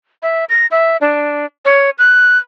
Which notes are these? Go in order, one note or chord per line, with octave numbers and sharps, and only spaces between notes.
E5
A#6
E5
D4
C#5
F#6